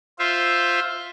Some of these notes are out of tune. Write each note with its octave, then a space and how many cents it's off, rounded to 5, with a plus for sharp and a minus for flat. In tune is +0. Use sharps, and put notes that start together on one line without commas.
F4 +0 C5 +0 E5 +0